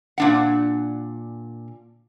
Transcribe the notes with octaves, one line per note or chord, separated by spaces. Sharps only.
A#2 D4 F#5